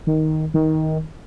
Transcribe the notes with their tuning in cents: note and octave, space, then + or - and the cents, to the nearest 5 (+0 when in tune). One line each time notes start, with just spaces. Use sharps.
D#3 +5
D#3 +15